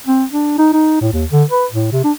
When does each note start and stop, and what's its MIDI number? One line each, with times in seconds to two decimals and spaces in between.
0.06 0.24 60
0.31 0.54 62
0.58 0.73 63
0.73 0.98 63
1.01 1.09 45
1.13 1.25 39
1.32 1.44 50
1.50 1.66 71
1.71 1.90 45
1.92 2.02 48
2.04 2.12 62